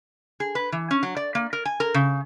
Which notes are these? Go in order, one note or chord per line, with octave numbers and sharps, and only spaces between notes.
G#4
B4
E3
C#4
F#3
D5
A#3
A#4
G#5
A#4
C#3